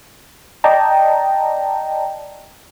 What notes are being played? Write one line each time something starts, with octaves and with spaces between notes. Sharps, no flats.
D5 D#5 G5 A5 A#5